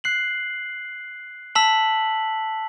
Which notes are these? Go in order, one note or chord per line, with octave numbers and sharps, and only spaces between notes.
F#6 C7 F#7
A5 E6 B6 F#7